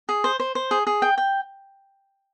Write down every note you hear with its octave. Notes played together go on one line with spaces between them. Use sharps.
G#4
C5
C5
C5
G#4
G#4
G5
G5